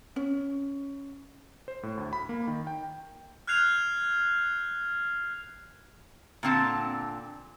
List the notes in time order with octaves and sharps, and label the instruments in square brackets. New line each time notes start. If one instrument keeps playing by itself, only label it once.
[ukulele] C#4
[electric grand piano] C5
A2
D2
B5
A#3
D#3
G5
[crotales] F6 F#6 G#6 C7 F7
[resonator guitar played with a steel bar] A#2 D3 C4 A5